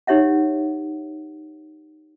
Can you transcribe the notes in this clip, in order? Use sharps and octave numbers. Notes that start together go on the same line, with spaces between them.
D#4 G4 C#5 E5 F#5